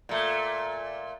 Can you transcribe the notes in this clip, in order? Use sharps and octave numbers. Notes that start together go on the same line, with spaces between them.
A#2 A3